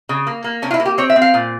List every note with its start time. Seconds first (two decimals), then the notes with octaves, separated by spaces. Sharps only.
0.09 C#3
0.27 A#3
0.44 A#3
0.62 C3 C#4
0.71 F4
0.74 E4
0.80 A#3
0.85 G4
0.98 C4 C#5
1.10 E5
1.16 C4
1.22 F5
1.34 A#2